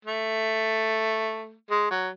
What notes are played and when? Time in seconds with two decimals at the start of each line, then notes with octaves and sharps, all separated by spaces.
0.05 A3
1.70 G#3
1.91 F#3